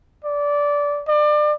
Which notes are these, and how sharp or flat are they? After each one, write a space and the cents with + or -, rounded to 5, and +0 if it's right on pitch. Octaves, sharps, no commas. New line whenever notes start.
D5 -15
D5 +30